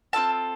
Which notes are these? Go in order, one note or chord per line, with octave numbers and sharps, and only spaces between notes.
C4 F4 A4 A5